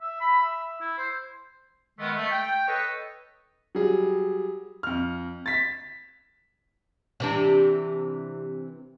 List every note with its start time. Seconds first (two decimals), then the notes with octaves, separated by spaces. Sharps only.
0.02 E5
0.21 B5
0.42 E5
0.81 E4
0.98 C5
1.98 D#3 G#3 A3 B3
2.15 A3
2.31 G5
2.68 A4 B4 C#5 D#5
3.75 F#3 G3 G#4
4.83 F2 F6
5.46 A6 B6
7.20 C3 E3 D4